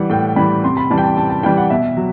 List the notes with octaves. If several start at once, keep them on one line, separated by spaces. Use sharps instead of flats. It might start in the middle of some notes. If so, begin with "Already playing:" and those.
Already playing: E3 G3 F#5
A2 G5
E3 G3 B5
C3 C6
B5
E3 G3 A5
G5
A5
C3 A5
A5
E3 G3 G5
F#5
B2 E5
F#3